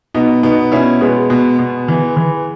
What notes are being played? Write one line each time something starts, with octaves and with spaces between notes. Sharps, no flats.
B2 B3 D#4
B2 B3 D#4
B2 C#4 E4
B2 G#3 B3
B2
B2
E3
E3